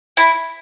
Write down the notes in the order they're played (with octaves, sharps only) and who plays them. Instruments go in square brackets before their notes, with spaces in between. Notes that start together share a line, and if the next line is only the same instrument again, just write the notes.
[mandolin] E4